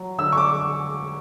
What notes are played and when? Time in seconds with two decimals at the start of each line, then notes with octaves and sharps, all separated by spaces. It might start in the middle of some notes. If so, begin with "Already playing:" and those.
Already playing: F#3
0.18 D3 E6
0.32 C#6
0.37 D6